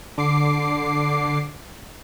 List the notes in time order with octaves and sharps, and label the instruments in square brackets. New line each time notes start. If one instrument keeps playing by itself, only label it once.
[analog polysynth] D3 D6 C7